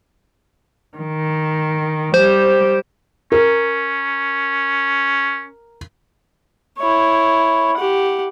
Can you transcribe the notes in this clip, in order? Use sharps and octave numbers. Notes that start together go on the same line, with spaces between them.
D#3
G3 G4 C5
C#4 A#4
E4 C#5
G4 F#5